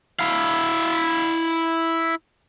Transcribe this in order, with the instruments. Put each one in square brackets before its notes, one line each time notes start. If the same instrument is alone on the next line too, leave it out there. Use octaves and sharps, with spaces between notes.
[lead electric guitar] E4 F5